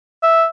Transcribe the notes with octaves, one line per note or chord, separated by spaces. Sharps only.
E5